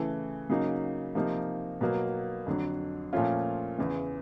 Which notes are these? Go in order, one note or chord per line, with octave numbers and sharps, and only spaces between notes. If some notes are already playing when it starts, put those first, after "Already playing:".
Already playing: C#3 E3 A3
C#3 F#3 A#3 D#4
C3 F3 A#3 D#4
B2 F#3 A#3
F2 D3 F#3
A#2 F3 A3 C#4 F4
E2 C#3 E3